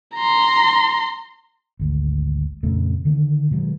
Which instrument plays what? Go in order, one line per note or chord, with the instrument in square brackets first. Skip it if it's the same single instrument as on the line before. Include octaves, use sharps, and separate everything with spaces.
[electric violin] A#5 C6
[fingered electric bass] G#1 D2
F2 A#2 C#3 A3
D3 D#3 A3 A#3
B2 D#3 F#3 G#3